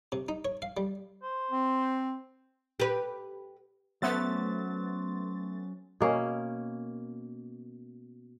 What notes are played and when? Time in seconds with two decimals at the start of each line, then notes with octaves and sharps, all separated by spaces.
0.12 C3
0.29 D#4
0.45 C#5
0.62 F5
0.77 G3
1.23 C5
1.51 C4
2.80 G4 B4
4.02 F#3 A3 B3 C#4 C5 A6
6.00 B2 A#3 C#4